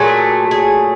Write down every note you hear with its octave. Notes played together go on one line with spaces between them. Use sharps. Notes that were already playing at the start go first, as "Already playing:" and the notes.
Already playing: A#2 F#3 A3 G#4
G#4